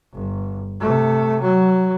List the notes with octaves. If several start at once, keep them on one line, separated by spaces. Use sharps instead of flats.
G1
C3 A3
F#3